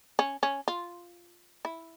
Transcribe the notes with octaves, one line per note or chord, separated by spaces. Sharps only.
C#4
C#4
F4
E4